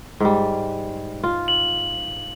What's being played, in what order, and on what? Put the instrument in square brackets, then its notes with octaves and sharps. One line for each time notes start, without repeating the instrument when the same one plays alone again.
[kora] G#2 G3
F4
[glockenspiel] F#7